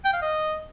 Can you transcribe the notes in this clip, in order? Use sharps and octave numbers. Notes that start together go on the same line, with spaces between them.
G5
F5
D#5